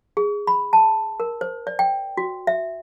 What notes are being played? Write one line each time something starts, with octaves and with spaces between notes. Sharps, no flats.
G#4
B5
A5
A#4
C5
D5
G5
F#4
E5